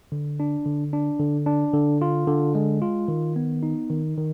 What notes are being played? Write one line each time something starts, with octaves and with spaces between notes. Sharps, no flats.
D3
D4
D3
D4
D3
D4
D3
F4
D3
G#3
F4
D#3
B3
D#4
D#3
D#3